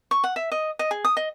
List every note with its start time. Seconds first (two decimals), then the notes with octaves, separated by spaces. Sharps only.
0.11 C#6
0.24 F#5
0.36 E5
0.52 D#5
0.79 D#5
0.91 G#4
1.05 D#6
1.17 D#5